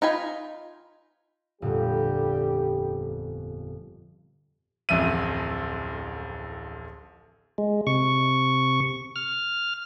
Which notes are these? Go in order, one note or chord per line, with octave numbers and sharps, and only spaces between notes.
D#4 F4 G#5 B5
G1 F2 A#2 G3 G4
D1 A1 F2 E5 D#7
G#3
C3 C#6
F6